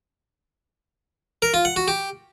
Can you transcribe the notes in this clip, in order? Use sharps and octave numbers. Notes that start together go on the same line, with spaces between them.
A#4
F4
F#5
F#4
G4